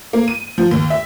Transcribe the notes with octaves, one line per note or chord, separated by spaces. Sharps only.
A#3
D#7
F3
D#2
E5